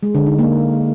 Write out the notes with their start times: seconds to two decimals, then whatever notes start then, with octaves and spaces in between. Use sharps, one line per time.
0.03 G#3
0.15 D3
0.27 D#4
0.39 A#3